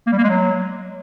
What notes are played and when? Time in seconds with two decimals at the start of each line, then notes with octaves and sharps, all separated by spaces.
0.07 A#3
0.12 G3
0.18 A#3
0.24 G#3
0.29 F#3